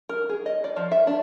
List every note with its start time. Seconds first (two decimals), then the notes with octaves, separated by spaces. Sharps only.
0.09 A#4
0.29 G#4
0.46 D#5
0.64 D5
0.76 F3
0.92 E5
1.07 D4